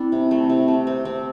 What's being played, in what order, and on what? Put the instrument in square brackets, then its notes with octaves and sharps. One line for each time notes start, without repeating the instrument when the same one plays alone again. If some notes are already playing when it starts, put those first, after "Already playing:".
Already playing: [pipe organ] C4 E4 [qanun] D4 A4
[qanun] C3
A3
C3
A3
C4
C4